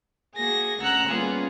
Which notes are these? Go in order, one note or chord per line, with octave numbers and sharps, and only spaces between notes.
A#3 F#4 G#4 G#5 A#6
D2 C#4 F#5 A#5 E6 F#6
G3 A#3 B3 C#4 F4 G#4